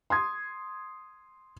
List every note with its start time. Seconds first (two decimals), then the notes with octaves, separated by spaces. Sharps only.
0.10 C6 D#6 G#6